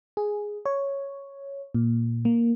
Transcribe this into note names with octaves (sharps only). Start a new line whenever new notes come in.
G#4
C#5
A#2
A#3